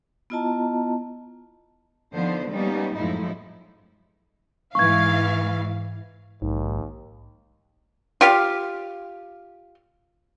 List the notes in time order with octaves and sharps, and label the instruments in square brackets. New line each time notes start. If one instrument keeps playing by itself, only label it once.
[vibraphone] B3 E4 F4 D#5 A5 A#5
[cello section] D3 D#3 F3 B3 C5
G3 A#3 B3 C#4 D#4
F#2 A2 F3 G#3 D#4 E4
[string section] G#2 E3 F5 [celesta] C#6 G#6
[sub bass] A#1 [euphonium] D#2 [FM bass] G#2
[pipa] F4 G4 F5